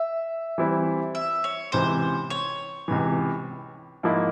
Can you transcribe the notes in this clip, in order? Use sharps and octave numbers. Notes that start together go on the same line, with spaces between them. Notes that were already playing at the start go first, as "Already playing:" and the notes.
Already playing: E5
E3 G3 C4 E4
E5
C#5
C#2 C3 E3 C5
C#5
C#2 C3 E3
G#2 F3 A#3 E4